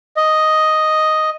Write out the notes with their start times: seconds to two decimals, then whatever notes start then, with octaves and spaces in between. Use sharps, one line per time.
0.17 D#5